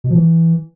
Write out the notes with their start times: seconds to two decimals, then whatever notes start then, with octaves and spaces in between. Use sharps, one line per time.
0.04 B2
0.10 F3
0.16 E3